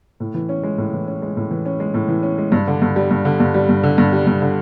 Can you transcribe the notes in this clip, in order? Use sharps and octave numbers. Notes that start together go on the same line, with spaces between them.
A2
E3
C#4
G#3
A2
E3
C#4
G#3
A2
E3
C#4
G#3
A2
E3
C#4
G#3
G2
D3
G2
G3
G2
D3
G2
G3
G2
D3
G2
G3
G2
D3